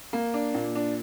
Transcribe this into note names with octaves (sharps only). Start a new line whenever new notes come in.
A#3
D4
A#2
D4